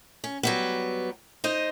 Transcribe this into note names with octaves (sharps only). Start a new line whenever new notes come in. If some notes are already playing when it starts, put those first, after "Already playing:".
C#4
F#3 G3 B3
D#4 C5 D#5